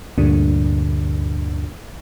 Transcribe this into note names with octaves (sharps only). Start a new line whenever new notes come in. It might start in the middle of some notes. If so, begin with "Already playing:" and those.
D2 G2 A#2 D3